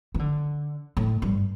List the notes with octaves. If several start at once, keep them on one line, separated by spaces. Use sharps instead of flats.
E3
D3
A2
G2